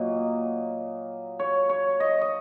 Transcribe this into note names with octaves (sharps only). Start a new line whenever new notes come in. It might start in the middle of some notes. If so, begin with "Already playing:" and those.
Already playing: A#2 F#3 D#5
C#5
C#5
D#5
D#5